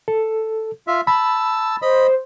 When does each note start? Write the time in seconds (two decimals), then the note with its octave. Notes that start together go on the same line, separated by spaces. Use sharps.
0.08 A4
0.87 F4 E5
1.07 A5 B5 E6
1.82 C5 D#5 B5